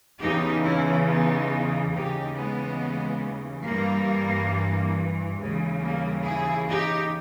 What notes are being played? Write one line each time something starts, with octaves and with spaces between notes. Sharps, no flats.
E2 C#3 E3 D#4 G4
C#4 E4
B3 D#4
D#2 C#3 E3 D#4 G4
G#3 B3
G2 E3 G3 A#3
D#2 C#3 E3 G#3
G3 A#3
E4 G#4
D#4 G4